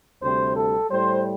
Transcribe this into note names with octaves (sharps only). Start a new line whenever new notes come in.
D2 C3 G3 C5
A4
A2 G3 C5